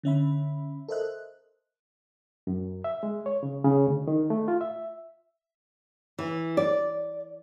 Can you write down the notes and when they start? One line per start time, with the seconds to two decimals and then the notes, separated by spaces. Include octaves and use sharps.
0.04 D3 C#4 E5 B5
0.88 A4 A#4 C5 D#5 E5 F#6
2.47 F#2
2.84 E5
3.03 G#3
3.26 C#5
3.43 C#3
3.64 C#3
3.87 D2
4.08 D#3
4.30 A3
4.48 F4
4.61 E5
6.18 E3
6.57 D5